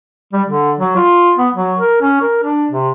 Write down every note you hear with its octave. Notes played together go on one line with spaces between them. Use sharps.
G3
D3
F#3
F4
B3
F#3
A#4
C#4
A#4
D4
C3